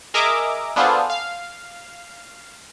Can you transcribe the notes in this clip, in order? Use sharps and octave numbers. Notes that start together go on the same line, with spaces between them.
G#4 A#4 D#5 E5 A#5 D6
B3 D4 F4 G#4 A4 C5
F5